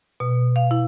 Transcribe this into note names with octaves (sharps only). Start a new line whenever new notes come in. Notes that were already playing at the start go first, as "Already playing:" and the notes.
B2
F5
E4